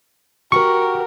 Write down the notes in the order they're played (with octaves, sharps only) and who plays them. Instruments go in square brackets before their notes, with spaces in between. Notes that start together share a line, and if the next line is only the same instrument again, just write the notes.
[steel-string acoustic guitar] F#4 G4 [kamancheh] A#4 [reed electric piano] C#6